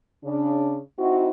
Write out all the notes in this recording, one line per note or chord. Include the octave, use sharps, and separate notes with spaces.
C#3 D4
C4 D#4 E4 F#4